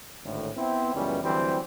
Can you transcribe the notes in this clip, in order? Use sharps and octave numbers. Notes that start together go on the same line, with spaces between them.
G#1 D2 A2
B3 C4 E4
C#2 F#2 E3 G3 B3 C#4
D2 E3 F#3 G3 C4